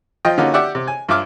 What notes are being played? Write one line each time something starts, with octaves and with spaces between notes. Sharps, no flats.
F3 F4 D#5 G5
D3 A#3 C#4 D#4 F4 F#4
G4 D5 E5 F#5
C3
G#5
G2 F4 E5 D6 F6